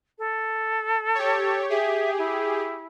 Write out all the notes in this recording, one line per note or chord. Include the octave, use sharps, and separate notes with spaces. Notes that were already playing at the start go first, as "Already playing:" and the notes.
A4
G4 C#5
G4 G#4 E5
E4